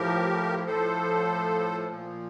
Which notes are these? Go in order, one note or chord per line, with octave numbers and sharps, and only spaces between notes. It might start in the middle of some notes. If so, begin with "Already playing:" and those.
Already playing: A2 F3 G4 A#4
A2 F3 A4 C5
A#2 F3